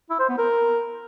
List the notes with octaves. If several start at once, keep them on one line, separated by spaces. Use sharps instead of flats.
E4
C5
B3
A#4